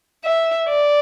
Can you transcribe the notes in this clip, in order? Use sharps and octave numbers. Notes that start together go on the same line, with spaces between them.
E5
D5